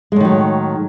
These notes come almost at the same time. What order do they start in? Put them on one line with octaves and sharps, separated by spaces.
G#3 A2 D#3 F#3